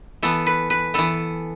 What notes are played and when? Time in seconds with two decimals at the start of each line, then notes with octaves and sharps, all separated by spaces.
0.23 E3 B3 A4
0.47 B4
0.70 B4
0.94 E3 B3 A4